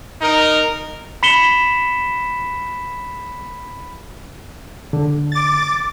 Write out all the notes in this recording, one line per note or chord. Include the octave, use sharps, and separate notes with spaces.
D#4 A#4
B5 B6 C#7 E7 G7
D3
D6 A6